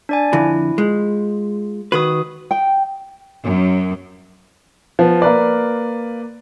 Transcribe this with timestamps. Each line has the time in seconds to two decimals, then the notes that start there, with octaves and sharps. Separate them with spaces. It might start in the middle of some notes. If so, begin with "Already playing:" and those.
0.09 D4 D5 G#5
0.33 F2 D3 E4
0.78 G#3 F4
1.92 D#3 F#4 B4 D#6
2.51 G5
3.45 F#2
4.99 F3 B3
5.22 A#3 A#4 B4 D5